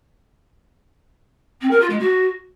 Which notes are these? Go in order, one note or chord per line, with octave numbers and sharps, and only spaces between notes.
C4
A#4
F4
G#3
F#4